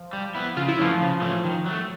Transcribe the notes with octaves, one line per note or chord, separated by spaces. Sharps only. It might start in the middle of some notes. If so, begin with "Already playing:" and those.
Already playing: F3
G3
B3 E4
C#3 F4
E4
E3 F3 A3 C#4 F4
C#3
E3 A3 C#4
D#3
F#3 A3